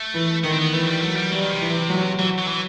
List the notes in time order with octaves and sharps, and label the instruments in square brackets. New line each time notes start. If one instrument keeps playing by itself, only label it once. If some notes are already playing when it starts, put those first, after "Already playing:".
Already playing: [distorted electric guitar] A3
[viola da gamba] E3
[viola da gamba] D#3 [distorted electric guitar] B3
[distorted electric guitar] C4
B3
[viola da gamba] E3 [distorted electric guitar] A3
[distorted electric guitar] F#3
G3
[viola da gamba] F#3 [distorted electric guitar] A3
[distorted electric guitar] G3
[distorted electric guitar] F#3 [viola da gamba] G3
[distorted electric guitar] D#3
C3
[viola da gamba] E3
F#3
[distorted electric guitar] E3 [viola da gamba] F#3
[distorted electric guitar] F#3
E3